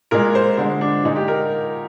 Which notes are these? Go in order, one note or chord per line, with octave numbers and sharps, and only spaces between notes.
A#2 G#3 A#4
C5
D3 G#3 C5
D4
A#2 G#3 D#4
G4
A#4